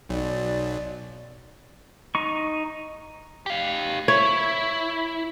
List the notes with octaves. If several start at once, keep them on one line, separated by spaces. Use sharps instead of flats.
B1 D5
D#4 C#6
G4 F5
E4 C#5